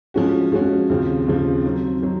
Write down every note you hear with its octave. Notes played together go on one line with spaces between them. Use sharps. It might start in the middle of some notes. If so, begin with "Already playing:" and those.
F3 G#3 C#4 F#4
F3 G#3 C#4 F#4
D#2 C#3 F3 C4
D#2 C#3 F3 C4
D#3 F#3 C4
D#3 F#3 C4